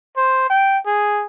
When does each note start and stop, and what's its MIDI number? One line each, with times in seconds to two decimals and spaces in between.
0.17 0.48 72
0.50 0.78 79
0.86 1.26 68